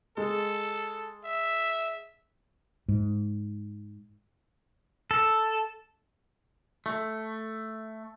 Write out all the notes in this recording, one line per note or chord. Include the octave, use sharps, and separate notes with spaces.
G#3 A4
E5
G#2
A4
A3